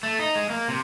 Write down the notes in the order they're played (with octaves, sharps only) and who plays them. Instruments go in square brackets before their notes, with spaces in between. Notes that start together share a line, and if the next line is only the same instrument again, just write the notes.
[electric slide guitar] A3
D#4
G#3
A#3
C3